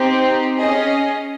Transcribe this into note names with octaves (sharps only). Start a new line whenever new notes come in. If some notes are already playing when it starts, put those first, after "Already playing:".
Already playing: C4 D#4 G4
C#4 G#4 D#5